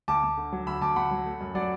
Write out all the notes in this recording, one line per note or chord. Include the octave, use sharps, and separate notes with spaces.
D2 A5 D6
D2
D3
F#3
D2 B5 E6
D2 A5 D6
D2 F#5 B5
F#3
A3
F#2
F#3 D5 F#5